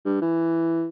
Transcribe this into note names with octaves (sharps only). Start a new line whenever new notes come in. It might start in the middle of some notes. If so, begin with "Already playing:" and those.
G2
E3